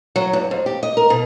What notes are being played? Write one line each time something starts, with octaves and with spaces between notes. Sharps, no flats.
F#3
G2
F2
G4
D#5
A#4
B2